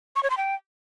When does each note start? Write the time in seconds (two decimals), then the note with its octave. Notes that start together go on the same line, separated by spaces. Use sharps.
0.16 C#6
0.23 C#5
0.30 C6
0.37 G5